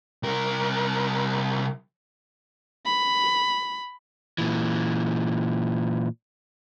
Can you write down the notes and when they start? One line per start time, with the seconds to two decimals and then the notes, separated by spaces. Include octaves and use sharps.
0.23 C2 A#4
2.86 B5
4.38 A#2 E3